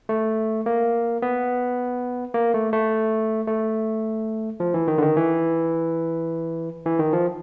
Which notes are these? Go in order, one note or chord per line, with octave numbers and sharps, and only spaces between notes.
A3
A#3
B3
A#3
A3
A3
A3
F3
E3
D#3
D3
D#3
E3
E3
D#3
F3